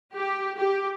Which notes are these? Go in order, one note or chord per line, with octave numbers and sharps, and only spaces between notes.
G4
G4